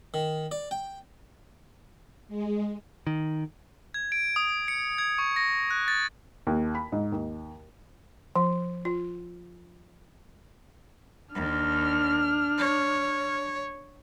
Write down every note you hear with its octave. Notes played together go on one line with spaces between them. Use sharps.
D#3
D5
G5
G#3
D#3
G#6
D7
D#6
C#7
G#6
C#6
A#6
F#6
A6
D#2
B5
G#2
D#2
F3
F4
D#2 D4 F6
C#5